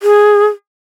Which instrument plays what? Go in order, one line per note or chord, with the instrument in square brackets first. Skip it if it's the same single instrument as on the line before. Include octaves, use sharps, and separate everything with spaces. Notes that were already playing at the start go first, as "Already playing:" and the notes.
[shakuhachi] G#4